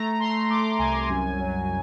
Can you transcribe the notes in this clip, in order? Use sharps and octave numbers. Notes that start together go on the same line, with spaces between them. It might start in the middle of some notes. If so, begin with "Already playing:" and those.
Already playing: A3 A#5
A3 C6
A3 D6
C2 G#5
F#2
F#3